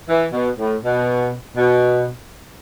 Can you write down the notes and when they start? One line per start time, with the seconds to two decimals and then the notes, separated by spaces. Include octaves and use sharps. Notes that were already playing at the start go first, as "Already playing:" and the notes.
0.08 E3
0.32 B2
0.58 A2
0.83 B2
1.57 B2